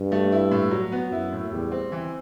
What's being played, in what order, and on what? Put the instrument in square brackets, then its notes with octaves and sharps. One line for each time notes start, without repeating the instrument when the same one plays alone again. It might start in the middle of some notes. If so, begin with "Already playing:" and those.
Already playing: [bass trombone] G2
[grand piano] A3
E4
A2
F#3
B3
[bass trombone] F#2 [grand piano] E4
[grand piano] A2
[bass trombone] E2 [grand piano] G3
[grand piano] C4
E3